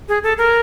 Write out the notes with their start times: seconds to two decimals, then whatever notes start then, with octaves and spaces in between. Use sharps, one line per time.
0.09 G#4
0.23 A4
0.38 A#4